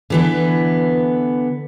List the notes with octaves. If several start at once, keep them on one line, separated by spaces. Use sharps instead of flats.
D3 E3 B3